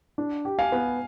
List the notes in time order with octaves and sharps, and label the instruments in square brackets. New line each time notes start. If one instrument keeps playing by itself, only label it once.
[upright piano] D4
G4
[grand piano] F5 G#5
[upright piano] B3